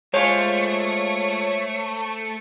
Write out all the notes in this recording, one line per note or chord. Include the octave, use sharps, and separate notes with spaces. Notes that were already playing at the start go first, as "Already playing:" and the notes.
G#3 A3 F4 C5 C#5 G#5